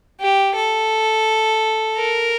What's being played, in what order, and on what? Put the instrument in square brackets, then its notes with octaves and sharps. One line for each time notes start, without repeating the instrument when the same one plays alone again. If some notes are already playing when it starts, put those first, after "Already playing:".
[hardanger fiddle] G4
A4
A#4